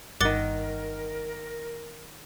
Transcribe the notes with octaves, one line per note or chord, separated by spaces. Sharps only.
G1 G2 D#3 A#4 F#5 D6 A6 G7